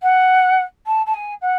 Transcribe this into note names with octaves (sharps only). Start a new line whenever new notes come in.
F#5
A5
A5
G#5
F#5